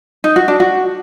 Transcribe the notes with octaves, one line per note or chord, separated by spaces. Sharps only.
D#4
F#4
D4
F#4